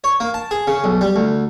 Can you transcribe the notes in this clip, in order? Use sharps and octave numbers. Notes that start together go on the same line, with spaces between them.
C#5
A#3
A5
G#4
C#3
B1
G3
D2